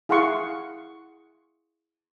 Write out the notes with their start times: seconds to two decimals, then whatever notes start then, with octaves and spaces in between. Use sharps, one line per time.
0.09 E4 G#4 F5 F#5 C6 C#6